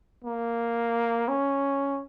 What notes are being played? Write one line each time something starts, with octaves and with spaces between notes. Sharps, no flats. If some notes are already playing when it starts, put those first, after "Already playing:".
A#3
C#4